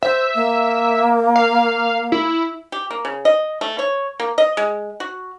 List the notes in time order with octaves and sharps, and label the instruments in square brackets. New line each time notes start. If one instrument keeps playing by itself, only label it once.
[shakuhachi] C5 [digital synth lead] E5
[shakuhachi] A#3
[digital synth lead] F5
E4
[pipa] G4
A#3
C#3
D#5
A3
C#5
A#3
D#5
G#3
F#4